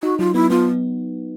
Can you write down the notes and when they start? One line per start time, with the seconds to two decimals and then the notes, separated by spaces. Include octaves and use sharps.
0.03 D#4 F#4
0.19 F#3 F4
0.34 B3 E4
0.50 B3 F4